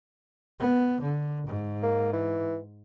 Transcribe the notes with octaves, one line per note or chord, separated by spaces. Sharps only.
B3
D3
G#2
A#3
E3